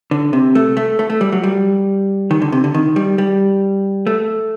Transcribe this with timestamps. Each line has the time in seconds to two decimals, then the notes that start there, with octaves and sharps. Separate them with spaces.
0.11 D3
0.33 C3
0.55 A3
0.77 A3
0.99 A3
1.10 A3
1.21 G3
1.32 F#3
1.43 G3
2.31 D#3
2.42 D3
2.52 C3
2.64 D3
2.74 D#3
2.96 G3
3.18 G3
4.07 A3